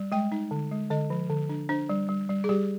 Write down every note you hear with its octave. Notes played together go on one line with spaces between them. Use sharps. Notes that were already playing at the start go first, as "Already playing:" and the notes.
Already playing: G3
G#3 G5
D#4
D3
G#3
D3 D#5
F3
D3
D4
D4 C5
G3
G3
G3
G#4
G3 G4